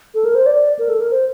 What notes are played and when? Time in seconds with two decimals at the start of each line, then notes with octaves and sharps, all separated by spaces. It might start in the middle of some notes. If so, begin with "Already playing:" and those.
0.15 A4
0.25 A#4
0.35 C5
0.46 D5
0.79 A#4
0.89 A4
1.00 A#4
1.11 C5